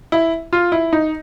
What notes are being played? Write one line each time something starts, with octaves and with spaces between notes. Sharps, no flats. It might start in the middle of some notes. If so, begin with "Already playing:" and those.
E4
F4
E4
D#4